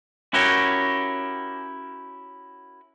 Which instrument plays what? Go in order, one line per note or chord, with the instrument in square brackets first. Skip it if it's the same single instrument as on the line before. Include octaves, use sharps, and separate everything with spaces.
[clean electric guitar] C#4 E4 F#4 G4 A#4 C#5